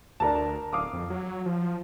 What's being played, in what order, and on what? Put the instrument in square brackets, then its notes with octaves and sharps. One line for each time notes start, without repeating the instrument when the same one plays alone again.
[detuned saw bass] D2 [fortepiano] D4 A#4 A5
[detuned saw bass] D1 [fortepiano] F5 D6 D#6
[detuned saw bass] F2
F#3
F3